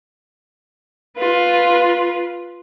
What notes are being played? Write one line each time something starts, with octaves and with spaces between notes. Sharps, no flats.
F4 B4